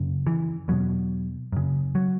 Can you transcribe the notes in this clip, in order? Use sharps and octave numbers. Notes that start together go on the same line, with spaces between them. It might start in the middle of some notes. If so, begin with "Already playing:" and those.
Already playing: F#2 C#3
E3
E2 B2 F#3
F#2 C#3
F#3